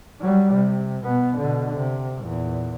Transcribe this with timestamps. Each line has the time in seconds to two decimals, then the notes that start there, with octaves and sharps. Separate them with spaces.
0.21 F#3 G3
0.54 C3
1.04 B2 B3
1.38 B2 D3
1.77 C3
2.22 E2 A#2